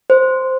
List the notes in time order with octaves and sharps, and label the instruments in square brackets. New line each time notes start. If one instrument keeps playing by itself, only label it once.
[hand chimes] C5